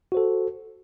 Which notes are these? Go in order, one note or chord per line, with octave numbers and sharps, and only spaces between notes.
F#4 A4 C5